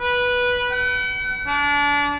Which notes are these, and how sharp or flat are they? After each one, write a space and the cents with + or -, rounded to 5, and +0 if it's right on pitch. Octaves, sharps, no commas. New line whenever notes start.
B4 -10
F#5 +45
D4 -30